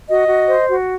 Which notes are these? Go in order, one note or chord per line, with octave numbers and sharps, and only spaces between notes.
F#4 D#5
F#4
C5
F#4